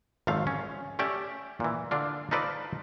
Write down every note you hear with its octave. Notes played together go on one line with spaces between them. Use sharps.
G#1 F#2 F3 A3 F5
C#4
A3 C#4 G4 D5 E5
A#2 E3
D3 D4 F4
D#4 F4 A4 B4 C5 D5